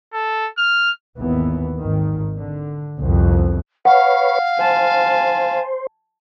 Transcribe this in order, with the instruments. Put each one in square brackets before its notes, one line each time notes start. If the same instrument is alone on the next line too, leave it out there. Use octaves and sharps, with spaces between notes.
[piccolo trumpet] A4
F6
[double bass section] G#1 D#2 E3 B3
G#1 D#3
D3
G1 C2 F2
[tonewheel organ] B4 C#5 [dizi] F5 [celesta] F#5
[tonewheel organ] C5 [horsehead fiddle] G#5 A5